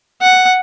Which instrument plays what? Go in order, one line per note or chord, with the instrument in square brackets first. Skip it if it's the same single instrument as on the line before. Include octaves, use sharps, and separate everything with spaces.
[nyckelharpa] F#5